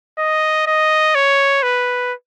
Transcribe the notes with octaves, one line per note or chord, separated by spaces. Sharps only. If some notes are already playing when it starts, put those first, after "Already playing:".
D#5
D#5
C#5
B4